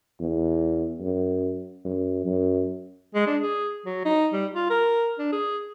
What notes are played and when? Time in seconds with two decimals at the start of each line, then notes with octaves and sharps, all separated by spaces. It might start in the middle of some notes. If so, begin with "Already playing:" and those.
0.20 E2
1.00 F#2
1.85 F#2
2.26 F#2
3.15 G#3
3.27 D4
3.41 G#4
3.85 F#3
4.05 D#4
4.33 G3
4.54 F4
4.70 A#4
5.19 D4
5.32 G#4